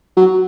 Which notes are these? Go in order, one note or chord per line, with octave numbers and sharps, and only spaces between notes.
F#3